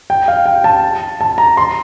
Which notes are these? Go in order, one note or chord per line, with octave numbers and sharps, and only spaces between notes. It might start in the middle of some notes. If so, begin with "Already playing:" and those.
G5
F5
G5
A5
A5
A#5
C6